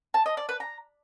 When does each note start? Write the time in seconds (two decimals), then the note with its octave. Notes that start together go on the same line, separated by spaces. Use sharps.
0.14 A5
0.26 D#5
0.37 D5
0.49 B4
0.60 A#5